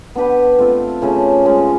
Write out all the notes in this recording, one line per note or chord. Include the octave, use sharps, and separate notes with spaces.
B3 D4 G4 B4
A3 C4 F4
C#3 F3 A3 C#4
F3 G#3 C#4 F4